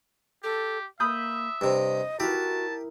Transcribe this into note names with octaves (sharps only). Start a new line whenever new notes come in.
G4 A4
A#3 E5 B5 D#6 G6
G2 C3 D#5
E4 F#4 G4 A#4 A5